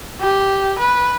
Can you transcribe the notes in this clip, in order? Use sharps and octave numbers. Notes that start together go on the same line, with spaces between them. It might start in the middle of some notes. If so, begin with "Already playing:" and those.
G4
B4